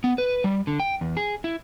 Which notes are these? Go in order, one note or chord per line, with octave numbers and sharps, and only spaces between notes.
B3
B4
G3
D3
G5
E2
G#4
E4